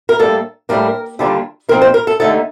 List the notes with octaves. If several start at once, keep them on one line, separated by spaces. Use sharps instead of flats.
A#4
A2 G3 A#3 D4 A4
A2 G3 A#3 D4 A#4
D#2 D3 G3 D4 F4
A#2 F3 C4 D#4 A#4
C5
A#4
A4
D#2 D3 A3 D#4 A4